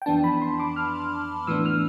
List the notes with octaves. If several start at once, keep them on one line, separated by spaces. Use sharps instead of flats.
G5
F2 E3 B3 D4 A5
B5
C6
D6
F6
A2 E3 B3 D4 E6
F6